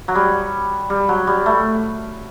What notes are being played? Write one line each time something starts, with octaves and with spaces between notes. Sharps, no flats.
F#3
G3
G3
F#3
G3
A3